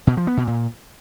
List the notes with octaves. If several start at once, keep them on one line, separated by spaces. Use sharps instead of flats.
B2
F3
B3
B2
A#2